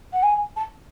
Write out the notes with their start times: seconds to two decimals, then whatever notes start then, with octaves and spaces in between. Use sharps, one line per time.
0.13 F#5
0.23 G#5
0.56 A5